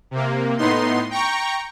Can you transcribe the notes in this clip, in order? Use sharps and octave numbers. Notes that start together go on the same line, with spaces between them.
C3 A#3
A2 B3 D#4 C6
G5 A#5 C#6